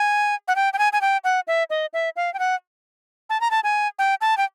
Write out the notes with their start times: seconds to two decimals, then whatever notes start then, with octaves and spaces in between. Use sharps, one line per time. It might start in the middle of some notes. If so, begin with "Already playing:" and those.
Already playing: G#5
0.48 F#5
0.56 G5
0.73 G5
0.79 G#5
0.93 G#5
1.01 G5
1.24 F#5
1.48 E5
1.70 D#5
1.93 E5
2.16 F5
2.34 G5
2.39 F#5
3.30 A5
3.41 A#5
3.51 A5
3.64 G#5
3.99 G5
4.21 A5
4.37 G5